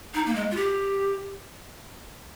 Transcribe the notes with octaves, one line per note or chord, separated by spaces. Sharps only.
D#4
A#3
G#3
F4
G4